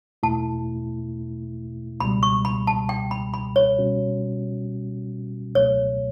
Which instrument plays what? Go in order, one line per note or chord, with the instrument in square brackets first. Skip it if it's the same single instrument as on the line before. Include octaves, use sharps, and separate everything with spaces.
[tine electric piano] E2 B2 A3 E4 [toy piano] A5
[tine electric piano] C#2 B2 G3 [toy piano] B5
[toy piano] C#6
B5
A5
G5
B5
B5
C#5
[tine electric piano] B2 G3 C#4 F#4
[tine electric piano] C#2 B2 F#3 A3 [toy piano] C#5